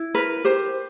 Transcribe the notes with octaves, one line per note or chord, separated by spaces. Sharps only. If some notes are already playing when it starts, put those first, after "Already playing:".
Already playing: E4
A#4 B4
G4 C5